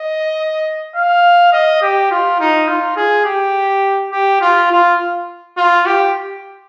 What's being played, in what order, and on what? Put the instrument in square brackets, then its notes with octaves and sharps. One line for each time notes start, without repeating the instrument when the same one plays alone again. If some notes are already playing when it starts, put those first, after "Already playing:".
Already playing: [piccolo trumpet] D#5
F5
D#5
G4
F4
D#4
F4
G#4
G4
G4
F4
F4
F4
G4